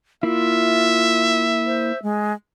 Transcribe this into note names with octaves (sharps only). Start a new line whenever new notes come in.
A#3 E4 F4 E5
C5
G#3